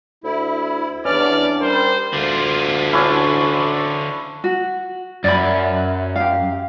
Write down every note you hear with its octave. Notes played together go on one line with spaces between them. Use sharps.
D2 E4
E2 E3 C#4 D4 D5 F6
G3 A#4 C5
D2 D3 F4
C#4 D4 E4
F#4
F#2 D5 E5 B5
G4 F5